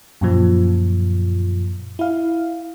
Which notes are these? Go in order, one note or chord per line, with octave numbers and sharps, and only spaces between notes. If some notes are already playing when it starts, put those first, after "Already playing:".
F#2 A#2 F3
E4 F5